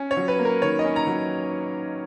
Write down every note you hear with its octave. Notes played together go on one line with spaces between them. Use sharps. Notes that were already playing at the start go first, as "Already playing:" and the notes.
Already playing: C#4
C#5
F#3
B4
A#3
A#4
D#3 C#5
D#5
C#4
A#5
F#3